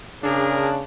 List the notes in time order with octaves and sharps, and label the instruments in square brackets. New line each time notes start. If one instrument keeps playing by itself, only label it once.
[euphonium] C#3 [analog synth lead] D4 [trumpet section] G#4 A#4